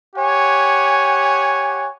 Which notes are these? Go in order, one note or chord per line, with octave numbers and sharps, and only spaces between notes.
G4 C#5 F#5 G#5